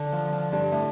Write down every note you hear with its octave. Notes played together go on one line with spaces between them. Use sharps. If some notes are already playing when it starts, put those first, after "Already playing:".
Already playing: D3
F3
F3
G2
A2